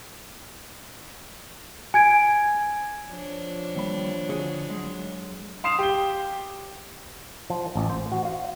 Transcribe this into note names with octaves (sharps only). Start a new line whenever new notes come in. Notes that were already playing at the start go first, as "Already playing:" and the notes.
G#5 G#6 D7
F3 D4 C#5
D#2 G3 B5
D3 F#4 G#4
F#3 G#3
F5 C6 D#6 C7 E7 F7
G4 G7
F3
A1
C5
F#4
F5